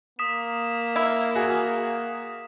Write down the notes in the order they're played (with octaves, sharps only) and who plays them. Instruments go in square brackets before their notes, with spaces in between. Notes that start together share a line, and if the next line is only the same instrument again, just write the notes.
[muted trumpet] A#3 [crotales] D#6 B6 E7
[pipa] E4
[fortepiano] F#4 G#4